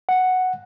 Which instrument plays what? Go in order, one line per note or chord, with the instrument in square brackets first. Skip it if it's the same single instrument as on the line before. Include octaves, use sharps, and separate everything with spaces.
[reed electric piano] F#5